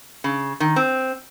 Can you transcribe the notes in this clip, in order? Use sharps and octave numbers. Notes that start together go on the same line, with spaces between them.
C#3
D#3
C4